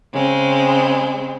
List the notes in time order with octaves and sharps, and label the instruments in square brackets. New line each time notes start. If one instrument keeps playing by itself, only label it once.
[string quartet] C#3 G#3 C4